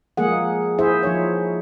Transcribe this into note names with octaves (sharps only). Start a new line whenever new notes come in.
F3 G#3 A#3 G#4 F#5
E4 G#4 C5 E5
F3 D#4 C#5